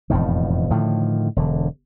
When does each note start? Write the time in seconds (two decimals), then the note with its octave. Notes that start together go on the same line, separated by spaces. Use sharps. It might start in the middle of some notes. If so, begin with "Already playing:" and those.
0.10 E1 F2 A2 D#3
0.70 A2 D3 D#3 F3
1.36 E1 D3